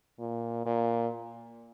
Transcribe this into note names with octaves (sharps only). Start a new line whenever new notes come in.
A#2
A#2